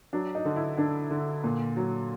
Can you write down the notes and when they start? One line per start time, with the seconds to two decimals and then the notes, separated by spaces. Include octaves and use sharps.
0.13 F#3 D4
0.35 D#4
0.45 D3
0.56 E4
0.78 D3 D4
1.11 D3
1.44 A#2
1.77 F#3